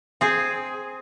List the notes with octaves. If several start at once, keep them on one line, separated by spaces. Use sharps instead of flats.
C4 G#4